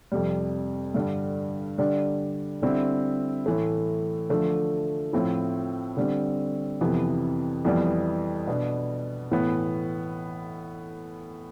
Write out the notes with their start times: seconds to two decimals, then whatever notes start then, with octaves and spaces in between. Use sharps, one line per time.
0.12 F2 C3 G3
0.94 G2 D3 G3 D4
1.78 D3 G3 D4
2.62 D3 G3 C4 E4
3.46 A2 E3 A3
4.30 D3 F3 A3
5.13 A2 F3 C4 E4
5.97 D3 G3 C4
6.81 F2 C3 E3 B3
7.65 F2 E3 G3 B3
8.47 B2 B3 D4
9.31 A2 E3 B3